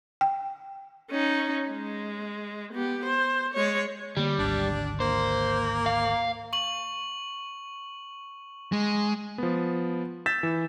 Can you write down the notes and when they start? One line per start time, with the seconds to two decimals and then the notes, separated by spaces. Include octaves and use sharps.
0.21 G5
1.10 C#4 D#4
1.70 G#3
2.73 B3 G4
3.05 C5
3.53 G#3 C#5
4.17 D3 G3 A#3
4.38 G#1 D2 D4
5.00 A#3 C5
5.86 F5
6.53 C#6 F#7
8.72 G#3
9.38 F3 B3
10.26 E6 G6 A6 B6 E7
10.43 E3